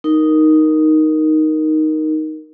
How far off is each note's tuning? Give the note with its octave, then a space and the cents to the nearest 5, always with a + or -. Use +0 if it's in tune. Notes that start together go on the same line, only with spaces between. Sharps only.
D#4 +0 A#4 +0